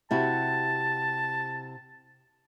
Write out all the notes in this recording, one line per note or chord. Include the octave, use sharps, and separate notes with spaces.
C3 E4 F#4 A5